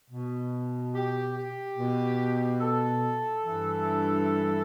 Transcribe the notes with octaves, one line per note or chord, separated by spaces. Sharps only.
B2
G4
G4
B2
A4
G2 E3